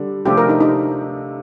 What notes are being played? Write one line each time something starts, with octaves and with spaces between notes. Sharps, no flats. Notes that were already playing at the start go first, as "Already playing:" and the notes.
Already playing: D3 G3 D4 A4
C3 F3 A3 D4 G4 A4
A#4
D#4
D#4